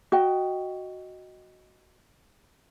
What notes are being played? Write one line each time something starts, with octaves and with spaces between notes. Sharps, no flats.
F#4 D#5 G5